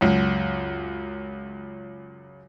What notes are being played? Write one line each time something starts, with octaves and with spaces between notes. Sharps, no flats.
C#2 F#2